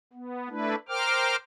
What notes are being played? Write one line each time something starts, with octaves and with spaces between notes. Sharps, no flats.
B3
A3 D4 E4 B4
A#4 C5 G5 D6 F6